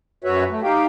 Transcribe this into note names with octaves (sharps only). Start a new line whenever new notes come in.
F#2 F#4 B4 C#5 E5
A3
D#4 G4 F5 G5